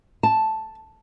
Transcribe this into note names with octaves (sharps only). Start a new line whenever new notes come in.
A5